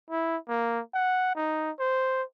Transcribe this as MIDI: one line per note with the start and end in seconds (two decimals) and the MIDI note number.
0.10 0.37 64
0.48 0.81 58
0.94 1.34 78
1.35 1.71 63
1.79 2.23 72